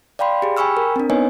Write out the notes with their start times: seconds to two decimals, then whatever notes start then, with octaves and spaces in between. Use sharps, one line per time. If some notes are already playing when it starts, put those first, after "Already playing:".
0.19 D5 F5 G5 B5 C6
0.42 G4 G#4
0.57 G5 G#5 B5 C#6 E6 F6
0.77 A#4
0.96 C4 D4
1.10 B3 D#4 B4 C#5 D#5 G#5